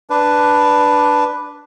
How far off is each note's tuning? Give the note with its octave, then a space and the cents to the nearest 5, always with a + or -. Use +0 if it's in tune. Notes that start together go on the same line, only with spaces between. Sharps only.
D4 +0 B4 +0